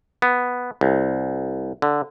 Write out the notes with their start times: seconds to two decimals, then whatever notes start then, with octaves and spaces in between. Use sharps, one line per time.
0.22 B3
0.81 C2
1.82 D3